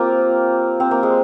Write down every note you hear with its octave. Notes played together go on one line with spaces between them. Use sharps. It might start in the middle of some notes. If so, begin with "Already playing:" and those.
Already playing: A#3 C4 F4 G4
C4
A#3
G#3